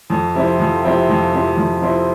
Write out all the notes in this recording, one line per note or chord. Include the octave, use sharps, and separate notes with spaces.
F2
C3 F3 C4 E4
F2
C3 F3 C4 E4
F2
C3 F3 C4 E4
F2
C3 F3 C4 E4